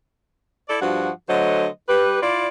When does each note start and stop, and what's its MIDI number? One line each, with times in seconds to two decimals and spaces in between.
0.69 0.77 64
0.69 0.77 69
0.69 0.77 74
0.81 1.10 43
0.81 1.10 53
0.81 1.10 66
1.28 1.67 50
1.28 1.67 54
1.28 1.67 57
1.28 1.67 72
1.28 1.67 75
1.88 2.22 55
1.88 2.22 67
1.88 2.22 71
2.22 2.48 64
2.22 2.48 65
2.22 2.48 74